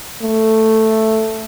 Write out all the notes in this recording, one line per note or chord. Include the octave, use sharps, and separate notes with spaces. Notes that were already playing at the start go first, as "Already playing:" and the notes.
A3